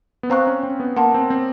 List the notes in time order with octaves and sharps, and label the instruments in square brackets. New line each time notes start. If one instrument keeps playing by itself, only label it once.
[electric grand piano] B3
[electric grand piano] C4 [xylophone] C5 F5 A#5 C#6 F#6
[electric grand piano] C#4
C4
B3
[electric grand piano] A#3 [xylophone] F#5 A5 C6
[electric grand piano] C4
C4